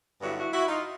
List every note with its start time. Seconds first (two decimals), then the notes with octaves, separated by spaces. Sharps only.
0.22 G2 D3 F#3 B3 D4 E4 F#4
0.37 E4 F#4
0.53 E4 F#4
0.68 D#4 F4